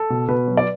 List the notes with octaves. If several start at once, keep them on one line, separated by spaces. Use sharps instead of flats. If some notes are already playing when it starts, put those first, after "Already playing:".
Already playing: A4
B2
B2 B4
F#3
D5